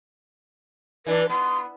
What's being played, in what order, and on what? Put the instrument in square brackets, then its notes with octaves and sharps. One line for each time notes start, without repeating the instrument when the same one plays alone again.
[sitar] E3 D4 [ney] B4
[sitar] B3 [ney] C6